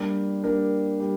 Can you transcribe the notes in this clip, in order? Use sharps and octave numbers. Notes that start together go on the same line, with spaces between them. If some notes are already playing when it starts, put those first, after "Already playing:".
Already playing: G3 A#3 D4 G4 A#4
G3 A#3 D4 G4 A#4
G3